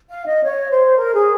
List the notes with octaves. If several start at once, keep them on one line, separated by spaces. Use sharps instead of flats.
F5
D#5
C#5
C5
A#4
G#4